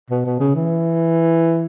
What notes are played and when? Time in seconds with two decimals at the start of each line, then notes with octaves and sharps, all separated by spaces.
0.10 B2
0.26 B2
0.40 C#3
0.55 E3